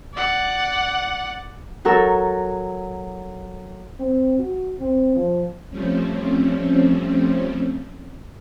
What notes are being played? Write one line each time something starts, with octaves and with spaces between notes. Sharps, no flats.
D5 F#5
F#3 F#4 A4 A#4 E6
C4
F#4
C4
F3
F3 G3 A3 C4 C#4